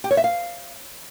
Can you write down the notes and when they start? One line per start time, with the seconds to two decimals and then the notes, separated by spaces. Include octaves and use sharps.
0.04 G4
0.11 C#5
0.17 E5
0.24 F5